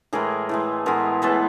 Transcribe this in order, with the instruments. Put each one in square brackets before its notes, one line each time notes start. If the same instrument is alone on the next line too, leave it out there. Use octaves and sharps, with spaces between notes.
[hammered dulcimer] A2 E3 G#3 G#4 A#4
A2 E3 G#3
A2 E3 G#3 B3 G#4 A#4
A2 E3 G#3 B3 A4 B4